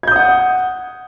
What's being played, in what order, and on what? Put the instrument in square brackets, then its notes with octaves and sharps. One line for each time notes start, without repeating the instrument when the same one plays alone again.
[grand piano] G#6
G6
D#6
F#5